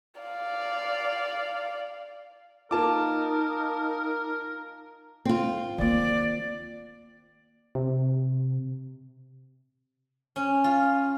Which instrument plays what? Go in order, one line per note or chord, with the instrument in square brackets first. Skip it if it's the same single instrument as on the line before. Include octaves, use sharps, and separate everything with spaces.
[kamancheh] D5 F5
[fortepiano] A#3 F4 [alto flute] D#4 [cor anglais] A#4 [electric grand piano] A5 D6
[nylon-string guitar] C4 F4
[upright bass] D#3 A#3 [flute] D5
[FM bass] C3
[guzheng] C#4
F4